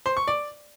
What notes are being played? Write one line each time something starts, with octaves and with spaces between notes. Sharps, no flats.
C5
C#6
D5